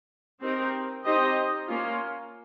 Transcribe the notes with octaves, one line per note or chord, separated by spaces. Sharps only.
C4 D#4 G4 A#4
C4 D#4 G4 C5 D#5
A#3 C#4 F4